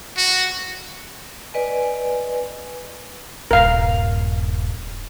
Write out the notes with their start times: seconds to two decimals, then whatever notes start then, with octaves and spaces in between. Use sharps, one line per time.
0.17 F#4
1.54 B4 D5 D#5 G#5
3.51 D#1 G2 A#4 F5